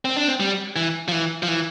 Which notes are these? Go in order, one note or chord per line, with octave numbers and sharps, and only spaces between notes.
C4
D4
C4
G3
E3
F3
E3
F3
E3